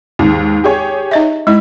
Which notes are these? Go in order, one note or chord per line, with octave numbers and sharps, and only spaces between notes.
D#2 G#2
G4 G#4 C#5
D#4 D#5 E5
G#3 E4